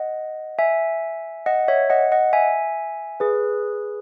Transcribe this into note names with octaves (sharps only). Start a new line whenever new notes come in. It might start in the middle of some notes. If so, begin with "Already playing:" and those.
Already playing: D#5 F#5
E5 G#5
D#5 F#5
C#5 E5
D#5 F#5
D#5 F#5
E5 G#5
G#4 B4